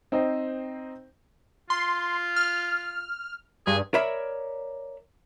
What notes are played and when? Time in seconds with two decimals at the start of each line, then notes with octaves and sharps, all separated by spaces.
0.12 C4 D#4 C5 D#5 G5
1.70 F4 C6
2.36 F6
3.67 G2 G#4
3.94 A#4 C#5 D5 E5 B5